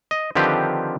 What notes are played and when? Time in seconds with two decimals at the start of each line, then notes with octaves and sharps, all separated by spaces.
0.11 D#5
0.35 D3 D#3 F3 C4 G4 B4